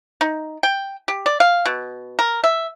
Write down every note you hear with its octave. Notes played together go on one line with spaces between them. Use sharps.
D#4
G5
G4
D5
F5
B2
A#4
E5